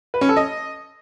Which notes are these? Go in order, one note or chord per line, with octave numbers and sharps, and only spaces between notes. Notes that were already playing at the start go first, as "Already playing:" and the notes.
B4
C#4
A4
D#5